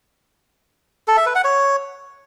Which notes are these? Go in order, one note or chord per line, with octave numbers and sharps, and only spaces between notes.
A4
E5
B4
F#5
C#5